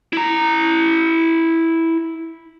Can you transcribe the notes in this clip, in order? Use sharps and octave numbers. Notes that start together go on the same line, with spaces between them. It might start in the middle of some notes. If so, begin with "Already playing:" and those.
E4 A#5